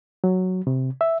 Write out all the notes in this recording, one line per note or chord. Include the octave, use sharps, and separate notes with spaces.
F#3
C3
E5